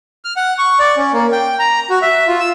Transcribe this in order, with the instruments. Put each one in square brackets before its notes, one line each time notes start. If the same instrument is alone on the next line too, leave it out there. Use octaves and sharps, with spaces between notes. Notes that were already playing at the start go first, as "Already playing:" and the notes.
[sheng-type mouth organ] F6
F#5
C#6
D5
C#4
A#3
G5
A#5
F#4
E5
F4
E6